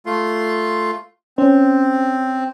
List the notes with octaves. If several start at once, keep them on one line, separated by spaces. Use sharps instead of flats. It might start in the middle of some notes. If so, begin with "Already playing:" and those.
A3 F4 C6
C4 C#4 C5